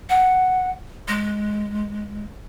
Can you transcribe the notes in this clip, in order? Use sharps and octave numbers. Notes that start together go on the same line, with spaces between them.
F#5
G#3